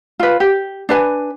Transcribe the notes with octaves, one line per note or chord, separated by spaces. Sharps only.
F4 B4
G4
D4 B4 G#5